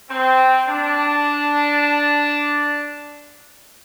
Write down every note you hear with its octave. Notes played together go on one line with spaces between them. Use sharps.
C4
D4